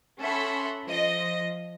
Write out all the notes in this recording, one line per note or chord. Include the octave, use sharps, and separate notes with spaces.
C#4 A4 E5 F#5 B5 C6
F3 D#5